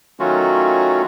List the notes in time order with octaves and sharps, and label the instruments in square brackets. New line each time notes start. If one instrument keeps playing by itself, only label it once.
[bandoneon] D#3 F#3 A3 C#4 F4 F#4